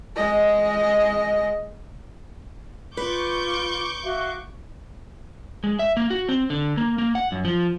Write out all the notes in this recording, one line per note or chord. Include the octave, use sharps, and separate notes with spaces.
G#3 D#5
F4 B4 C#6 D6 G6
F#4 E5 F5
G#3
E5
A#3
F#4
C4
D3
A#3
A#3
F#5
F#2
F3